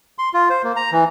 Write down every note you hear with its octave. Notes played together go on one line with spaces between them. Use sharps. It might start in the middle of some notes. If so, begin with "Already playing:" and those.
C6
F4
C5
A#3
A#5
E3